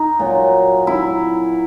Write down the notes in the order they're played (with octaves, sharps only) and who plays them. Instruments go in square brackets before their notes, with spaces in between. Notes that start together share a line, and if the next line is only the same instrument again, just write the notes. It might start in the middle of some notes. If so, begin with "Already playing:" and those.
Already playing: [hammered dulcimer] D#4
A#2 F#3
E4